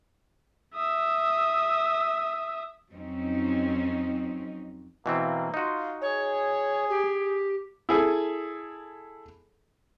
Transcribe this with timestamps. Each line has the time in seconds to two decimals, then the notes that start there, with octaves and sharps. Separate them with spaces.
0.75 E5 D#6
2.92 F2 F#3 C4 C#4 D#4
5.06 B2 E3 A#3 C4
5.54 D#4 F4 F#4
6.02 G#4 C#5
6.89 G4
7.89 E4 G#4 A4